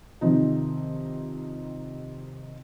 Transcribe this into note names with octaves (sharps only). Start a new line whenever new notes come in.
C3 D#3 F3 D#4